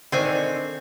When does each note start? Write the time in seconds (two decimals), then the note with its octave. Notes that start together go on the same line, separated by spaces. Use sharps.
0.12 D3 D#3 C4 G#5